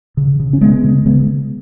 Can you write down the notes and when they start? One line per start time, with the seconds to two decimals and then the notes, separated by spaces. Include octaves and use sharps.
0.17 C#3
0.40 C#3
0.53 C#4
0.61 C#3 G#3 B3
0.84 C#3
1.06 C#3 G#3 B3